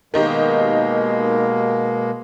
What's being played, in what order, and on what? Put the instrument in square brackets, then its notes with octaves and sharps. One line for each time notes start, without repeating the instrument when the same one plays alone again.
[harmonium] B2 G#3 A#3 [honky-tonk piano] D#3 D#4 G4